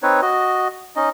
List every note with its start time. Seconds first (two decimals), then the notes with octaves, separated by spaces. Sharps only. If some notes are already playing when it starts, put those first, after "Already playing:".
0.03 C4 D#4 B4 C#5
0.22 F#4 D#5
0.96 C#4 D#4 D#5